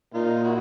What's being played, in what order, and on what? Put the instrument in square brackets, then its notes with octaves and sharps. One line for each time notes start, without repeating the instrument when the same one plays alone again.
[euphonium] A#2 [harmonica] D#4 F4
[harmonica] E4 F#4